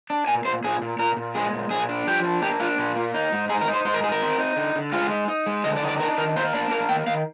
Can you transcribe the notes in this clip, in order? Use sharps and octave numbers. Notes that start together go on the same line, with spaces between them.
D4
A#2 G#5
A#2 C5
A#2 G#4
A#2
A#2 A#4
A#2
G#3 G#4
A#2
A#2 G#4
D4
F3 G4
D4
A#3 G4
D4 F4
A#2
A#3
D#4
G#2
D#4 G#4
A#4
D#4
C5
G#2 C5
A#4
D#4 G#4
A#4
C4
D#4
D3
D3
G#3 F4
D#4
D#4
G#3
D3 D#5
D5
D#4
D5
D4 A#4
D#3 A#4
A#3 C5
D4 D5
A#3 A#4
D#3 G5
D#3 F5